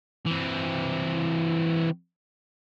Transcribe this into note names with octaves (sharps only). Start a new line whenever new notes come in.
E3 C4